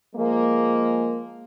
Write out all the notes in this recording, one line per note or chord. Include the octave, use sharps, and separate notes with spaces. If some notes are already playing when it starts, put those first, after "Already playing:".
F3 G#3 A#3